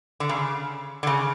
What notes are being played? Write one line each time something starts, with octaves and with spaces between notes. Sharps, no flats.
D3
C#3
D3
C#3